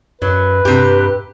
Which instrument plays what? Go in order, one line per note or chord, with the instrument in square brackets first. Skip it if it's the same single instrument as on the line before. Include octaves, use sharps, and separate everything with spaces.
[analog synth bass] F#2 [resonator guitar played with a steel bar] F#3 [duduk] B4
[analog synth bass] G2 [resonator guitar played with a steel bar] C3 G4